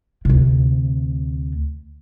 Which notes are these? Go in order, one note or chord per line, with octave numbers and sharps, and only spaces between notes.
D2 C3